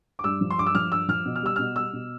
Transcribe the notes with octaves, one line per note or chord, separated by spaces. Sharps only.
D6
G2 E6
F3
C6
G2 D6
E6
F3 F6
G2 E6
F3 F6
B2
F6
G3 E6
B2 F6
G3 E6
B2